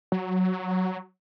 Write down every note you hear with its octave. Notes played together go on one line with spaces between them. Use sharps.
F#3